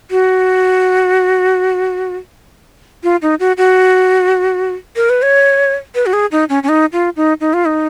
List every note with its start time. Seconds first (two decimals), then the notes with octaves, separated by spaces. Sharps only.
0.11 F#4
3.03 F4
3.22 D#4
3.40 F#4
3.57 F#4
4.96 A#4
5.10 B4
5.22 C#5
5.95 B4
6.06 F#4
6.13 G#4
6.32 D#4
6.49 C#4
6.63 C#4
6.69 D#4
6.93 F4
7.16 D#4
7.41 D#4
7.54 F4
7.65 D#4